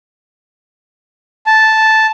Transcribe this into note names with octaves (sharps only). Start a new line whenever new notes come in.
A5